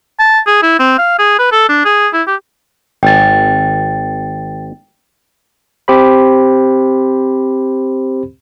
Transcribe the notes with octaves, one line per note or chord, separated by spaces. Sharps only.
A5
G#4
E4
C4
F5
G#4
B4
A4
D4
G#4
E4
G4
G#1 G5 G#5 A6
C4 G4 C5 B5